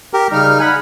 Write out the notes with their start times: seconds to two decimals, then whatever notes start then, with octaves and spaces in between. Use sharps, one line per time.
0.13 G4 A#4
0.32 C#3 G3 D#4 F6
0.60 F#5 G#5 B5